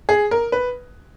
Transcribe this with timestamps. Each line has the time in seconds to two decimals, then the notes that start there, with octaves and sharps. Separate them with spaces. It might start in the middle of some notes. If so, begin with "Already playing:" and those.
0.09 G#4
0.31 A#4
0.52 B4